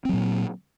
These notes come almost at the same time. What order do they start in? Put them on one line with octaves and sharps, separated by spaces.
C4 F#3 A#2